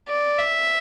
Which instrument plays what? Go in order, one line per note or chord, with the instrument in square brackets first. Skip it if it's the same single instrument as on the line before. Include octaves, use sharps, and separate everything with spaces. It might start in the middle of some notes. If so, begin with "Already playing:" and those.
[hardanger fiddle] D5
E5